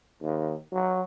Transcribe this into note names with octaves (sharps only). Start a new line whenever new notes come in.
D#2
F#3